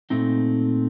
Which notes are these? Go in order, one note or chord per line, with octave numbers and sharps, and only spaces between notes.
A#2 A3 C4 D#4